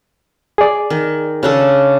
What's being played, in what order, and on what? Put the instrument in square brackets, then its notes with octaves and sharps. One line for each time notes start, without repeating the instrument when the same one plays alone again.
[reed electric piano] G#4 D5
[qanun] D#3
C#3 D4 A4